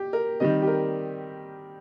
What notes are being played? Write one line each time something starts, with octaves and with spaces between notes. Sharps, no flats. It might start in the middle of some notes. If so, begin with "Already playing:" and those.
Already playing: G4
A#4
D#3 G3 C4 D#5
G4
A#4